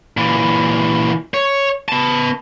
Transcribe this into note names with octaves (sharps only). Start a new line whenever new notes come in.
A#2 E3
C#5
B3 A5